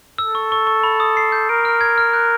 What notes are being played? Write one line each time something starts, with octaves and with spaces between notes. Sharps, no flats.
A4 E6
C#6
C#6
C#6
B5
D#6
C7
G6
A#4 D7
F6
G#6
F6
F#6